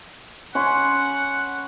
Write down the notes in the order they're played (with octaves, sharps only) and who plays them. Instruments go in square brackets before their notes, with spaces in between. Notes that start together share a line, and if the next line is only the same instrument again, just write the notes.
[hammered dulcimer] C#4 B5 C6 [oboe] F#5